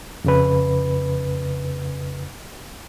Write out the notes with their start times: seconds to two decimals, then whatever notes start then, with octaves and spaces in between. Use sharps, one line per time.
0.24 F2 C#3 B4